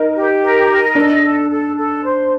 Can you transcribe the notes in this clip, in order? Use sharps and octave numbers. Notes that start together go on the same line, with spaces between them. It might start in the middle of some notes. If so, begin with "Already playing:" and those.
Already playing: D#4 A#4
G4
A#4
D#5
D4 A4
A4
A4
A4
C5